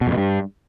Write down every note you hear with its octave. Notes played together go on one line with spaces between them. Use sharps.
B2
F2
B2
G2